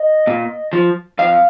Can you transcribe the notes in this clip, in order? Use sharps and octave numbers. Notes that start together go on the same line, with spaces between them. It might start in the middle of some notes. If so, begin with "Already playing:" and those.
Already playing: D#5
A#2
F3
F2 F5